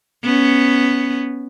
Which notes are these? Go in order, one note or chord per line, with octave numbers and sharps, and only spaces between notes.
B3 C#4